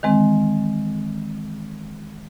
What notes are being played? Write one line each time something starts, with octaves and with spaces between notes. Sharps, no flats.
D#3 E3 G#3 C4